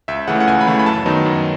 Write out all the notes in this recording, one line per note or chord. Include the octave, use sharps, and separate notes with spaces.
C#2 E5
C#3 E3 A3 F#5
F#5
C#2 G#5
B5
C#3 E3 A3
B5
F#2 A5
D#3 F#3 B3 D#4
F#2